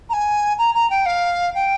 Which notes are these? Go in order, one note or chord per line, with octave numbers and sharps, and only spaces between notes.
A#5
G#5
A#5
A#5
G5
F5
G5